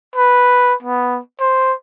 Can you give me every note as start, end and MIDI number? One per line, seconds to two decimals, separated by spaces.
0.16 0.74 71
0.83 1.20 59
1.40 1.73 72